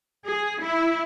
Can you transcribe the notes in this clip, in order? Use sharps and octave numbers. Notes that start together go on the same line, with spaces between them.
G#4
E4